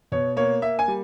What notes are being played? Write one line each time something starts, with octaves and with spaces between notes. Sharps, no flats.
B2 C#5
A#3 C#5
A#3 E5
G#5
G3